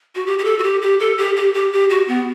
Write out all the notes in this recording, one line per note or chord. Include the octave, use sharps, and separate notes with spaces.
F#4
G4
G4
A4
F#4
G4
G4
A4
G4
G4
G4
G4
F#4
B3